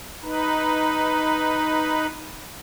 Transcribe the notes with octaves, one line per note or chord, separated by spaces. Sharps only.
D#4 B4